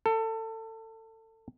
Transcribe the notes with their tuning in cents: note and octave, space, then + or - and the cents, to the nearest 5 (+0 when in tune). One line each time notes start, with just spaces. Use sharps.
A4 +25